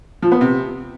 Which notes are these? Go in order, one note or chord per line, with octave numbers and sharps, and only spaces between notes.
F3
B3
C3